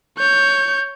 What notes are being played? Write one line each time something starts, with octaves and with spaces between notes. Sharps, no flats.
C#5 G6